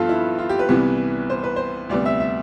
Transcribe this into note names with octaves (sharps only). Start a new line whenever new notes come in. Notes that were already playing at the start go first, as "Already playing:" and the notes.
Already playing: G2 F3 B3 F4 A4 B4
E4
F4
G4
B4
C2 C3 E3 G3 B3
C5
B4
C5
D2 C3 G3 B3 D5
E5
E5